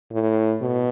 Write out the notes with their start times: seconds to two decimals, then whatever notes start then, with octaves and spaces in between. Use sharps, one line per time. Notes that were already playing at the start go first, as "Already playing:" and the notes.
0.12 A2
0.61 B2